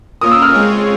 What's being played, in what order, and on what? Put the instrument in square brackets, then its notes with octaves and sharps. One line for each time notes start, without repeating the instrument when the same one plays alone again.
[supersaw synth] A#3 C#4 F4 A#4 [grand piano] D#6
[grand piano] E6
F6
[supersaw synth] G#3 C4 F4 G#4 C#5